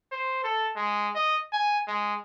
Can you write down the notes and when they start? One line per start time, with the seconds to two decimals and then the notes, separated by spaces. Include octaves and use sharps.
0.12 C5
0.44 A4
0.76 G#3
1.15 D#5
1.53 G#5
1.87 G#3